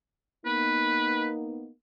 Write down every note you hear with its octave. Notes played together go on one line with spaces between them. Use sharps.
A#3 B3 D#4 B4